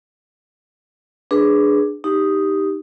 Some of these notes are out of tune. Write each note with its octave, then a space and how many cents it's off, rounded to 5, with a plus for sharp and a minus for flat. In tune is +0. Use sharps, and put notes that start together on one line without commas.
D4 +10 G#4 +0 B4 +0
D#4 +0 G4 +0